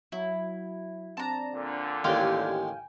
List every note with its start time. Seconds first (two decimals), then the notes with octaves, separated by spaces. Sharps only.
0.12 F#3 E4
1.17 C4 D4 A5 A#5
1.53 A#2 D3
2.04 A1 D#2 G#3 F5 G5 G#5